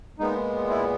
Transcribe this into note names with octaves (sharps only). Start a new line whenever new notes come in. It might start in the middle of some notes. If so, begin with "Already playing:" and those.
A#2 G#3 B3 D#4
E4